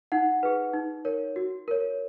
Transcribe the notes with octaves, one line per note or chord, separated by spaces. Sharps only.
D#4 F#5
G#4 B4
D#4
A#4 C#5
F#4
A#4 C#5